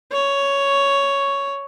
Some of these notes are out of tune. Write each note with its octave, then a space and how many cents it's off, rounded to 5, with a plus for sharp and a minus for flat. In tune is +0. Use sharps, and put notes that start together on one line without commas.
C#5 +5